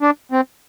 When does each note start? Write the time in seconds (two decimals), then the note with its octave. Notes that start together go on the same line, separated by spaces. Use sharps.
0.01 D4
0.32 C4